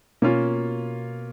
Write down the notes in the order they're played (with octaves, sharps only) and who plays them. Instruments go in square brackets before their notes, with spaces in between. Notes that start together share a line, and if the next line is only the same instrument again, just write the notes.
[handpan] B2 [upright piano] A#3 C#4 F4